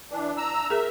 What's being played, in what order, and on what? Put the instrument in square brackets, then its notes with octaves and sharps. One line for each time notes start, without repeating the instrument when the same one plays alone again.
[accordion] E3 D4
A#5 E6
[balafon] G#4 A#4 [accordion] E5